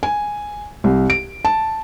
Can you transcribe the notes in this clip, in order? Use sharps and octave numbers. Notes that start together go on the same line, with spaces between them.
G#5
C2
D7
A5